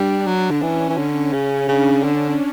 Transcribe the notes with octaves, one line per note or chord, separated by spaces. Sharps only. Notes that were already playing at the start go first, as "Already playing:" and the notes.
Already playing: G3 D4
F#3
D3
E3 C#4
E3
D3 C#4
C#3
C#3 D4
D3